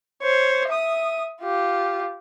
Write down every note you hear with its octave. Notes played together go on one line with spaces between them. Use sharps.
C5 C#5
E5 D#6
F4 G4